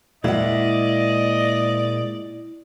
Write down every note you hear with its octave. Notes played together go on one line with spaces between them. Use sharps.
A#2 G#3 A#3 E4 D5 D#5 F#5